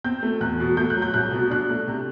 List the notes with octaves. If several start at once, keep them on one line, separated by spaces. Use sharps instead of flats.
C4 G6
A3
E2 F#6
B2
A3 G6
F#6
F#3
G6
C2 F#6
B2
D4 F#6
A3
C3